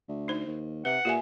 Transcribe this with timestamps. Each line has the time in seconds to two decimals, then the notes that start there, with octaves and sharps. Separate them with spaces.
0.08 D2
0.28 D#4 C5
0.46 D#2
0.85 C3 B4 F#5
1.05 A#2 G4 E5 G#5